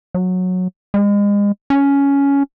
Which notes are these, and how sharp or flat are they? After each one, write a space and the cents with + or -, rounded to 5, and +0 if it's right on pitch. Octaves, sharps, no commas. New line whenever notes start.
F#3 -15
G#3 -35
C#4 +10